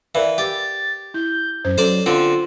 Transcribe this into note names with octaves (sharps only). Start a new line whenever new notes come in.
E3 A#4 D5 F5
G4 A6
E4 G6
F#2 C5
F#3 C#4 A4 C5 D5
D3 C4 F4